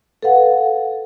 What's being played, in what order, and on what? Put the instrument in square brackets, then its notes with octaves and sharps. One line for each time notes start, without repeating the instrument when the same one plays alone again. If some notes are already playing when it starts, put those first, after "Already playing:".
[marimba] A4 B4 F5 F#5